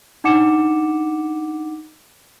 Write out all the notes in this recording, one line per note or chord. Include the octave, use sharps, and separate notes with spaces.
D4 D#4 F#5 D6 C#7 E7